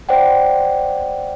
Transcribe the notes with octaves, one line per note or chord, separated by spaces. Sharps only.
C5 D5 F#5 G5